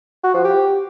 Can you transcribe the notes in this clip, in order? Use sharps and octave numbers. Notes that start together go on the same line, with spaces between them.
F#4
F3
G4